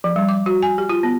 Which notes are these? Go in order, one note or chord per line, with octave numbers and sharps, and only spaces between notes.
F3
G3
D6
F#4
G#5
G4
F4
B3